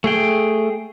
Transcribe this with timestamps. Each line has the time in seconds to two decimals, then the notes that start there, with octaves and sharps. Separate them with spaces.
0.04 A3 G#4 G5